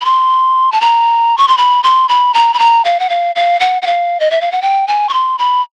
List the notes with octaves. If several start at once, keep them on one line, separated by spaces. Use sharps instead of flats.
B5
C6
A5
A#5
C#6
C6
B5
C6
B5
A#5
B5
A#5
F5
F#5
F5
F5
F#5
F#5
F5
D#5
E5
F5
F#5
G5
G#5
C#6
C6
B5